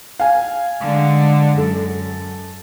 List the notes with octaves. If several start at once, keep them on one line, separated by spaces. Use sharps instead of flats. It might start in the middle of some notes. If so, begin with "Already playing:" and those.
F5 G#5
D3 G#3
F#2 A4